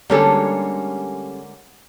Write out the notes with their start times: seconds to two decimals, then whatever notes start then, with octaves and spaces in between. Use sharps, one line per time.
0.10 D3 G3 G#3 A#3 C#4 A4